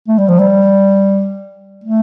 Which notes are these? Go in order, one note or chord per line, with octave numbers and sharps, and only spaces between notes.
A3
G3
F3
G3
A3